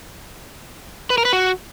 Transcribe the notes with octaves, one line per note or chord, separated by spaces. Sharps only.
B4
A#4
B4
F#4